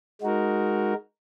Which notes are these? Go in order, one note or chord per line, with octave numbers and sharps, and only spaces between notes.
G#3 D#4 F#4 A#4